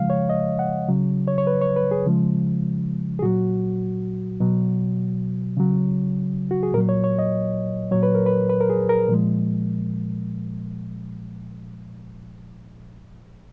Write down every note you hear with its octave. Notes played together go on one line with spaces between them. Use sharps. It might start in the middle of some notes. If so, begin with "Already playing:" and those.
Already playing: C#3 F3 G#3 F5
C#5
D#5
F#5
C#3 F#3
C#5
C#5
B4
C#5
B4
G#4
C#3 F3 G#3
G#4
A#2 F#3 F#4
B2 F#3
C#3 F#3
F#4
G#4
A#2 F#3 A#4
C#5
C#5
D#5
A#2 F#3 C#5
B4
A#4
B4
B4
A#4
G#4
A#4
A#2 F3 G#3